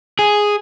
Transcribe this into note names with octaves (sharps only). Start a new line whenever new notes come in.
G#4